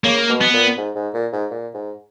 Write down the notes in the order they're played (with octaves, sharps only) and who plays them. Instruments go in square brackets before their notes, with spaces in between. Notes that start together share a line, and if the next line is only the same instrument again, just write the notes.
[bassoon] C#3 [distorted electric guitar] A#3
[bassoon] B2
[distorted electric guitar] B3
[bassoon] A#2
G#2
G#2
A#2
G#2
A#2
G#2